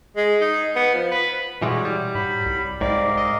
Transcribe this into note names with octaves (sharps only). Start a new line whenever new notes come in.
G#3
D#4
B3
F3
B4
B2 E3 G3 G#3 F#4 C#5
G3
G#2 F#3 B5
C2
C2 G#2 G4 A#4 D5 F5
D#5